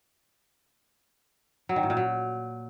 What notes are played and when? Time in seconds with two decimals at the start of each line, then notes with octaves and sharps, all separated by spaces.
1.69 F#3
1.76 D#3
1.83 A2
1.90 A#2
1.97 F#3